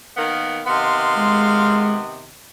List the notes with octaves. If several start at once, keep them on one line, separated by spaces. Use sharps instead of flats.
D#3 A#3 B3
C3 D#3 B3 F5 C6
G#3